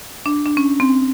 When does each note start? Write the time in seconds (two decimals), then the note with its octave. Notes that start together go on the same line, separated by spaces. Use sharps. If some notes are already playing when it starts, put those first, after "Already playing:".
0.26 D4
0.46 D4
0.57 C#4
0.80 C4